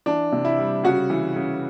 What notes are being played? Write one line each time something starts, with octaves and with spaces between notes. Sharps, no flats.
E3 D4
C3
E4
G3
C#3 F#4
E3
C#3